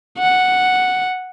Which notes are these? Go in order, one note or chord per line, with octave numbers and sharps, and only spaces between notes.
F#5